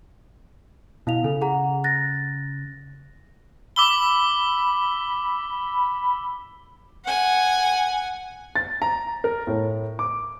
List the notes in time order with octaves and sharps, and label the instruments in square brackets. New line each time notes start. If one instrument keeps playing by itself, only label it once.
[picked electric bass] B2 [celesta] E4 F5 F7
[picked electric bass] C#3 [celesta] A4
[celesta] G#4 F#5 A#5
F#6 A6 A#6
[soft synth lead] B5 [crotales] D6 E6 G7
[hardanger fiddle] F#5 G#5
[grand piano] A6
A#5
A#4
A2
D6